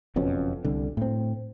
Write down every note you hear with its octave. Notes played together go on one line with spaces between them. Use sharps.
F#1 F2 B2 C#4
C2 D3
A2 C4